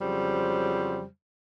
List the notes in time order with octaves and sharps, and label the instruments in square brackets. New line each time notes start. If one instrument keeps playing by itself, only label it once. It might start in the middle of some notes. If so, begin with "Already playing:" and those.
[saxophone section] F2 C#3 F#3 G3 C5